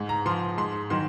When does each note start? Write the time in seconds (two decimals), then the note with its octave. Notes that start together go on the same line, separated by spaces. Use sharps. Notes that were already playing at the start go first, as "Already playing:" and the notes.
Already playing: G#2
0.09 A#5
0.26 F3 C6
0.58 G#2 C6
0.90 D#3 F#3 C6